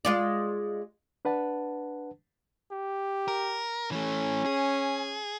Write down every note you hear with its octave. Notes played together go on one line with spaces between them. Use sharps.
G#3 F4 D5
D4 B4 F#5 A5
G4
A#4
E3 A3 C#4
G#4